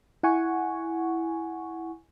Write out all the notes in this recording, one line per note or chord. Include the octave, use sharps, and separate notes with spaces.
E4 F#5 G#5 C#6